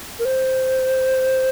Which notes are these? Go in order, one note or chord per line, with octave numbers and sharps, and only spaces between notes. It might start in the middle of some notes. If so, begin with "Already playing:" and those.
A#4
C5